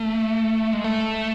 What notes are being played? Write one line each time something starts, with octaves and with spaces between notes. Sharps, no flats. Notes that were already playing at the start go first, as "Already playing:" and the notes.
Already playing: A3
G#3
A3